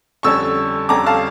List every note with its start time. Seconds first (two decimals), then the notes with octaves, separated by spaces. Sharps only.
0.23 F2 D3 G3 C#4 C#6 E6
0.89 F2 D3 G3 C#4 A#5 D6
1.06 F5 A5